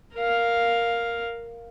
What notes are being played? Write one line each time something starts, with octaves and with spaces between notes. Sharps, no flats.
A#4 F5